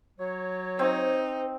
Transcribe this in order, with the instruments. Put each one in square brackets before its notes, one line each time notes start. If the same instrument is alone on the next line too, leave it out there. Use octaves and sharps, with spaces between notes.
[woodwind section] F#3 C#5
[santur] C4 [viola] D#4 [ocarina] C5